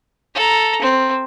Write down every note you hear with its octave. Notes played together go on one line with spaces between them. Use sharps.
A4 A#5
C4